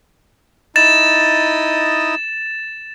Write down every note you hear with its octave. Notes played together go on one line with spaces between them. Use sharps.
D#4 E4 D#5 A6 E7